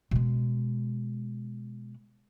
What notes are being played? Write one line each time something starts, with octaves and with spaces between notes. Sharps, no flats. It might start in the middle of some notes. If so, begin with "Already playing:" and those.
B2 G#3